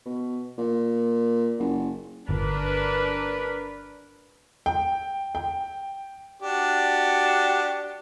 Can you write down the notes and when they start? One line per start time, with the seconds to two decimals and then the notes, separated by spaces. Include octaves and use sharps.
0.06 B2
0.58 A#2
1.59 F#1
2.29 G1 D4 A#4 B4
4.66 G5
5.35 G5
6.42 D4 F#4 G4